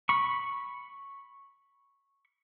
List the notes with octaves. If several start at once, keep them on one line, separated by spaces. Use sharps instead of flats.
B5 C#6